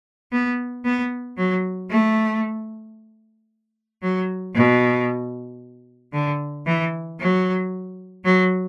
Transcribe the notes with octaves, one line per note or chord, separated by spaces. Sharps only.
B3
B3
F#3
A3
F#3
B2
D3
E3
F#3
F#3